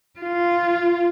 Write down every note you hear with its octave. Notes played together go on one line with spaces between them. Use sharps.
F4